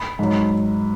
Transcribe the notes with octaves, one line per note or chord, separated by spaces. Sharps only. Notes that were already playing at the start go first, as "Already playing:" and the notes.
Already playing: B5
G#2 F#3